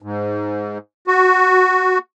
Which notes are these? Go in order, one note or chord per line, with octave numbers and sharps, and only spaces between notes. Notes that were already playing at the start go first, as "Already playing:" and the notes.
G#2
F#4